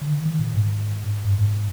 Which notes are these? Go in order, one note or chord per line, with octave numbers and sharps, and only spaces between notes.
D3
D#3
D#3
A#2
G#2
G2
G#2